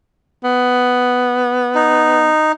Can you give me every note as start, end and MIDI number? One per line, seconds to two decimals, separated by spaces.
0.44 2.31 59
1.75 2.52 63